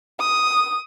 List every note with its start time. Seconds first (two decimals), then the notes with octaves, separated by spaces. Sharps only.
0.20 D#6